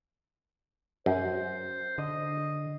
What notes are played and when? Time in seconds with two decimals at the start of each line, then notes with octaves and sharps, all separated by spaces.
1.06 F#2 C5
1.98 D3 D#5